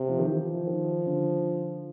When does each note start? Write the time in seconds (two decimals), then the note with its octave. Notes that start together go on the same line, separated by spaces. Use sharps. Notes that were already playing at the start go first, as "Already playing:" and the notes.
Already playing: C3
0.09 F3
0.19 D#3
0.28 E3 F3
0.67 D#3
1.06 D3